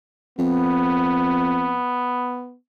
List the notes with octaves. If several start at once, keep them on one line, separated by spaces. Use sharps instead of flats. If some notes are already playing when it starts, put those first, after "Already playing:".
F2 B3